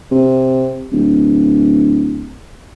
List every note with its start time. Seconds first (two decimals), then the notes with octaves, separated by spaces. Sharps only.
0.11 C3
0.92 D1